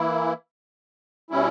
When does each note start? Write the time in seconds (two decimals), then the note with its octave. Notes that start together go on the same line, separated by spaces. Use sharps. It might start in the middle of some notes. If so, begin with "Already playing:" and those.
Already playing: E3 A#3 E4
1.30 B2 G3 C#4 E4